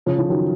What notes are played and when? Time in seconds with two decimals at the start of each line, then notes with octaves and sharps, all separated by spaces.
0.06 C#3 F3
0.18 C#3 F3
0.29 D#3 F#3